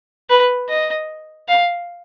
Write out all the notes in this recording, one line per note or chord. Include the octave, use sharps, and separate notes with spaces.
B4
D#5
F5